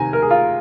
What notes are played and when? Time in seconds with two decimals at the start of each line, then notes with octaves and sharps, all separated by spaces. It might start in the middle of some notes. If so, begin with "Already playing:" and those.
Already playing: C3 D#3 G#5 A#5
0.13 A#4
0.22 G#4
0.31 F4